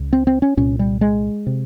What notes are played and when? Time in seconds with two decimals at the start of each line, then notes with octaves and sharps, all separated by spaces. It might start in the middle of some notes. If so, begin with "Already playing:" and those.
Already playing: C#2 C#3
0.13 C4
0.27 C4
0.42 C#4
0.57 C2 A#2 C#4
0.79 G3
1.01 G#3
1.47 C3